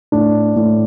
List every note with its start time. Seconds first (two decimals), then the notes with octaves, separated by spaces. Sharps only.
0.12 A2 D4
0.56 A2